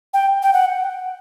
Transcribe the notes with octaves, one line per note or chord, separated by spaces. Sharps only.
G5
G5
F#5